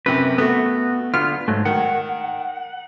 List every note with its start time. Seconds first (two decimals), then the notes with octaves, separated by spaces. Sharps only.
0.06 F#2 C3 B4
0.38 A3 B3 F#4
1.14 D3 B3 F4 F6
1.48 G#2 F#3 A3
1.65 D#3 F#5